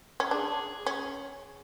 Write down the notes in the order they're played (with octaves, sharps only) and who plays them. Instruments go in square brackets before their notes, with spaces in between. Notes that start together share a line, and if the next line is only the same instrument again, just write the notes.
[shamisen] C#4
[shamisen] D4 [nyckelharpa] G#4
[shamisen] C#4